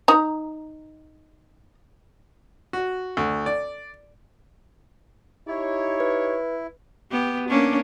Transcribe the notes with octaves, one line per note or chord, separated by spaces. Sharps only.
D#4 A#5
F#4
D2
D5
D#4 E4 G4 C#5
B4
B3 G4
A#3 C#4 D4